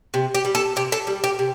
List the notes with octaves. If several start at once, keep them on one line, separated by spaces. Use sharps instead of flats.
C3
G4
G3
A4
C3 G4
A4
G3
G4
C3